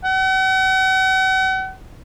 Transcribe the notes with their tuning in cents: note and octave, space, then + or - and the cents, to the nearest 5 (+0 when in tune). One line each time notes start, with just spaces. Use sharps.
F#5 +40